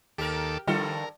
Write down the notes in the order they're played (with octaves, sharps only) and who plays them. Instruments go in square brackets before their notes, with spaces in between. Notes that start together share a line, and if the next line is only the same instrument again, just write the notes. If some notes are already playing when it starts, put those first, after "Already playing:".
[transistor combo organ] D#2 A4 D6 [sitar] G4 A#4
[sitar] G2 D3 A4 [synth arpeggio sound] D#3 G3 F4 [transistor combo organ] A#4